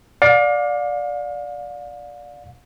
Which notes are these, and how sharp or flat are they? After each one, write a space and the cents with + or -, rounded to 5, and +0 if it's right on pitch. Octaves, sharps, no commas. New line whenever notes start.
D5 +0 F5 +35